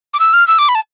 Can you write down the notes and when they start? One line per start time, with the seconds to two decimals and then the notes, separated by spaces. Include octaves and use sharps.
0.14 D6
0.20 E6
0.33 F6
0.48 E6
0.59 D6
0.69 B5
0.75 A5